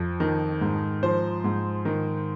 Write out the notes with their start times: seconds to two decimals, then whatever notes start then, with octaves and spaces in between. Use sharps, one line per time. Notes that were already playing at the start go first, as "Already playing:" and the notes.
Already playing: F2 F3
0.20 D#3
0.61 G#2
1.03 F3 C5
1.44 G#2
1.85 D#3